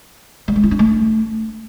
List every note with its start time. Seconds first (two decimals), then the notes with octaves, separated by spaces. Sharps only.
0.48 G3
0.56 G#3
0.63 E4
0.71 D4
0.79 A3